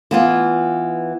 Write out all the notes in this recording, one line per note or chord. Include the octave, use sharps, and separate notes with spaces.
E3 B3 F4